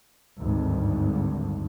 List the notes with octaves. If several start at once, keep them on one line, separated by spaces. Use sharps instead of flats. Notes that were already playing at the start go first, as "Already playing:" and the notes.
G#1 D2 G2